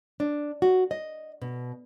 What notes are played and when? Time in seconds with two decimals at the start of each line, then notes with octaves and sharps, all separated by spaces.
0.20 D4
0.62 F#4
0.91 D#5
1.42 B2